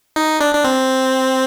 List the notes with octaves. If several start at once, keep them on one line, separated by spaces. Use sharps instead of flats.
D#4
D4
D4
C4